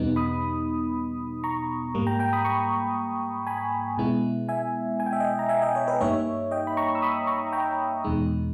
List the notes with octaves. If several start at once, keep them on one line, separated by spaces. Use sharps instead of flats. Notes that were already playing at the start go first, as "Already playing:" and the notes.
Already playing: E2 B2 G3 B3 D#4
B5 D#6
A#5 C#6
G#2 G3 A#3
G5 A#5
G5 A#5
B5 D#6
A#5 C#6
G#5 B5
B2 G#3 B3 E4
E5 G#5
G#5
G5
E5
D#5 G5
A#5
E5 G#5
D#5 G5
C#5 E5
B4 D#5
G2 G3 A#3 D#4 C#5 E5
D#5 G5
B5
A#5 C#6
E6
B5 D#6
A#5 C#6
G5 A#5
E2 B2 G#3 D#4